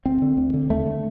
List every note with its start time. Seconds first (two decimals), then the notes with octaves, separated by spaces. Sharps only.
0.05 D2 C4
0.22 D3
0.37 D2
0.54 D3
0.70 D#2 A3
0.86 D3